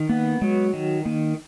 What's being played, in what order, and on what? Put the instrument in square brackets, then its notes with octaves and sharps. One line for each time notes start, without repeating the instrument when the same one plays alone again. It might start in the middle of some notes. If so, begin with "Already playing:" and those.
Already playing: [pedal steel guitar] D#3
[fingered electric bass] A#3 [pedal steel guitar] B3
[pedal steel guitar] F#3 [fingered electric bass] G#3
[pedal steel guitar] D#3
[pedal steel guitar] D#3 [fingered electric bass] A#3